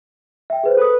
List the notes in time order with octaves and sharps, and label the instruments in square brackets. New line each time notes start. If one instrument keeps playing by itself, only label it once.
[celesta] E5 G5
G#4 B4 C5
[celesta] A4 D#6 [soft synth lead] B4